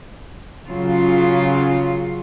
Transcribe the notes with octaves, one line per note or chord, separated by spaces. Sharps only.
C#3 F#3 F4